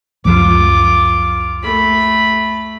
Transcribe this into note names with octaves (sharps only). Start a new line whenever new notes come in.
C#2 F#2 F3 F4 D6
A3 B5